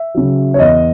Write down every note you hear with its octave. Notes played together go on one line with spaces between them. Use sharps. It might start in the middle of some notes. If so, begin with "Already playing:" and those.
Already playing: E5
C#3 F#3
C#5
E2 D#5